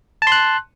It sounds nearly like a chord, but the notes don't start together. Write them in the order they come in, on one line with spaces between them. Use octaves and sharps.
A5 C6 F#6